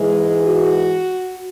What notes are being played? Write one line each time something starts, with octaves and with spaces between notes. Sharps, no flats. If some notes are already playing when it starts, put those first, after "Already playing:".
Already playing: G#2 E3 G#3
F#4